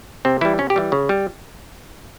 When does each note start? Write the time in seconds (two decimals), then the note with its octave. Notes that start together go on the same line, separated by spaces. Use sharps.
0.25 C3 C4
0.41 E3 G3 E4
0.58 C3 C#4
0.70 G4
0.76 E3 G3
0.92 C#3
1.09 G3